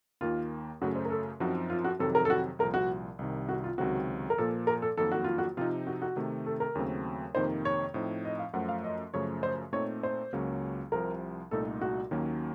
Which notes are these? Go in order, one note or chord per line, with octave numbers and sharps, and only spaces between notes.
D#2 D#3 A#3 F4
F#2 C#3 A3 F#4
C5
A#4
A4
F#2 F3 C4 D#4 F#4
F4
F#4
F2 C3 D#3 F#3 A4
A#4
A4
F#4
C2 A#2 F3 A#4
F#4
C2 C3 D#3
F#4
F4
C#2 C3 D#3 F#3 C4 F#4
A#4
A#2 F3 A#3 A4
A#4
A4
F2 D#3 F#3 A#3 A4
F#4
F4
F#4
C3 F3 C4 D#4 F4
F#4
F#4
C3 D#3 A3
A4
A#4
D#2 C#3 F#3 A3 C4
F2 C3 D#3 A#3 D#4 C5
C#5
A2 F3 C4 D#4
D#5
F5
F#2 F3 A3 F#5
F5
D#5
F#2 C#3 F3 A3 C#5
C5
A#2 A3 C4 D#4 C#5
C5
C#2 C#3 F#3 A#3 C#4
C2 C3 F3 A#4
C2 A#2 A3 D#4 A4
F#4
D#2 D#3 F#3 A#3 C#4